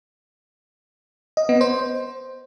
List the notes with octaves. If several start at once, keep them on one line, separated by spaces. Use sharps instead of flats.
D#5
B3
C5